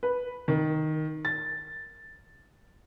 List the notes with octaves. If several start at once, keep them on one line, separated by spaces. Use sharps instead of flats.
B4
D#3
A6